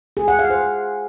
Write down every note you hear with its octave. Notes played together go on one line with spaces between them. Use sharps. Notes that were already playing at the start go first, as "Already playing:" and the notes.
G#4
F#5
F5
C5